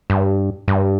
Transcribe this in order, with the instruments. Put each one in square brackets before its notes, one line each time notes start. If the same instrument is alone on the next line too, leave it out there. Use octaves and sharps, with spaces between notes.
[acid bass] G2
G2